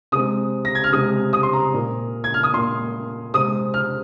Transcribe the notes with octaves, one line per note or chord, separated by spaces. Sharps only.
C3 G#3 C4 D#6
A#6
G#6
F6
C3 G#3 C4 D#6
D#6
C6
A#5
A#2 A#3
G#6
F6
D#6
A#2 A#3 C6
C3 G#3 C4 D#6
F6